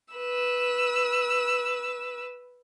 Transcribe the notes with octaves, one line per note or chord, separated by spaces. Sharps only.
B4 E6